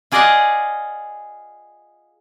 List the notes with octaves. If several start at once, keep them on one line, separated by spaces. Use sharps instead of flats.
F4 G#4 D5 D#5 F5 F#5